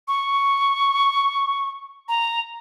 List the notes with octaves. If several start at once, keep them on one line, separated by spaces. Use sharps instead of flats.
C#6
A#5